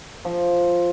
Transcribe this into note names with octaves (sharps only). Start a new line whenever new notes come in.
F3